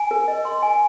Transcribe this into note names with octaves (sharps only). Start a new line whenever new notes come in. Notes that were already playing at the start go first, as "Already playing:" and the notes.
Already playing: G#5
A#4
D#5
C6
G#5